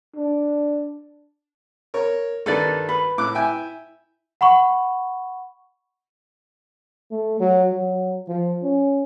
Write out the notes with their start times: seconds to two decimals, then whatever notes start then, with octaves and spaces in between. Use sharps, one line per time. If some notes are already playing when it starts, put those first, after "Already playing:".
0.16 D4
1.94 A#4 C#5
2.46 G2 D#3 A4 B4 D5
2.89 B4
3.18 A2 D6 F#6
3.35 E4 G5 G#5
4.41 F#5 B5 C#6
7.11 A3
7.40 F#3
7.73 F#3
8.28 F3
8.63 C#4